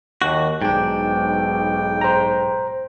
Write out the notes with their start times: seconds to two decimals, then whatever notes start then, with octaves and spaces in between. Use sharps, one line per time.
0.22 D#2 F#4
0.62 B1 G#2 D4 G5
2.01 C5 A#5